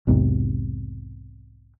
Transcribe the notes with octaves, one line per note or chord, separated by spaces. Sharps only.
B1 E2 G#2 C3